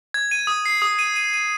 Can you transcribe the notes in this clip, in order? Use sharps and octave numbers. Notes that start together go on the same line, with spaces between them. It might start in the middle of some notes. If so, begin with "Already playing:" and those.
G#6
D#7
D#6
C7
D#6
D#7
D#7
D#7